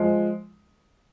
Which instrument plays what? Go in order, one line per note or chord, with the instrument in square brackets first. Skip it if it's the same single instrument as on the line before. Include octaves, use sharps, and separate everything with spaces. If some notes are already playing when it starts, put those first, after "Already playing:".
Already playing: [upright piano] F3 G#3